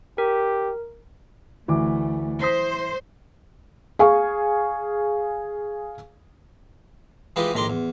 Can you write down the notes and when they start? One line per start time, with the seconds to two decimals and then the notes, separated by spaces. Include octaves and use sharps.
0.18 G4 A#4
1.68 D2 E3 A3 D6
2.42 C5 D#6 A#6 B6
3.99 G#4 F5 G#5 C#6
7.36 E3 G#3 D#4 F4 G4 B4
7.54 A#1 A2 D#3 A#5 C6 D6
7.70 E2